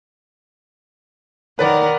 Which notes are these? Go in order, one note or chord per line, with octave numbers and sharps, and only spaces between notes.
D#3 A#4 B4 D5 F#5